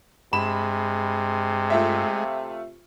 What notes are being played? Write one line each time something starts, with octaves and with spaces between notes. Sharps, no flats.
G2 C3 G#3 B5 E7
A3 F4 E5